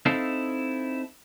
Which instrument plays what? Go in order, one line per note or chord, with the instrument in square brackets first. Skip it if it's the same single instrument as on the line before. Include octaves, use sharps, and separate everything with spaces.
[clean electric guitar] C4 D#4 E4 A4 F5